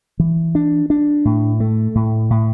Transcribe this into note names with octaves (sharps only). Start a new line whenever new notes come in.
E3
D4
D4
A2
A3
A2
A2